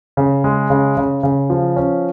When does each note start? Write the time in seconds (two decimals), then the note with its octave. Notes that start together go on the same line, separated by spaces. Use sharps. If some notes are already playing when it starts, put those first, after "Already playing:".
0.17 C#3
0.44 G#3
0.70 C#3
0.97 C#3
1.23 C#3
1.50 F3
1.76 C#4